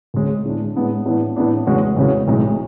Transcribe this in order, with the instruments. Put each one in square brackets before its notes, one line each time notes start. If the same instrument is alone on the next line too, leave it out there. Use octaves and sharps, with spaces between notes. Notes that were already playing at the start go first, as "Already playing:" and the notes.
[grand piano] D2 D3 G#3 C#4 G#4
A2 G#3 B3 D4
A2 G#3 B3 D4
A2 E3 B3 D4
A2 E3 B3 D4
E2 C#3 G#3 C#4 F#4
E2 C#3 G#3 C#4 F#4
B1 A2 G#3